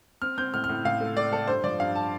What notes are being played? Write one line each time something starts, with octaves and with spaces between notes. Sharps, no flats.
C4 F6
C4 G6
A2 F6
F6
A2
A2 F5
A3
A3 D5
A3 A4
G2 C5
F3 D5
G2 F5
A5